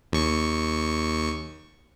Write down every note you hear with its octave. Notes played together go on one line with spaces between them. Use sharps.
D#2 C#6